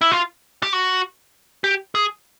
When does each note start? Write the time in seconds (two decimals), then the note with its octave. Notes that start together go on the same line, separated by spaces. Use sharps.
0.01 E4
0.11 F4
0.63 G4
0.73 F#4
1.64 G4
1.95 G#4